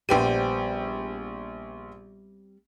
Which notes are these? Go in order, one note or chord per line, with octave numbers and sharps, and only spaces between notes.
A#1 G3 B3 C4 G5 D#7